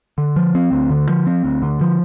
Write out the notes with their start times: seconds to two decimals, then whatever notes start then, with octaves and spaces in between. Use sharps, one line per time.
0.18 D3
0.36 F3
0.55 C4
0.72 D2
0.90 D3
1.09 F3
1.26 C4
1.44 D2
1.62 D3
1.81 F3